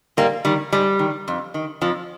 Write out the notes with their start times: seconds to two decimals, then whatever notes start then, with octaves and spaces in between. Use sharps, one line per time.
0.17 G#2 G3 A#3
0.45 D#3 G3
0.73 G#2 G3
0.99 D#3
1.28 F2
1.54 D#3
1.81 F2 F3